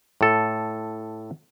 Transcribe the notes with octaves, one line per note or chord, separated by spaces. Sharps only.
A2 A4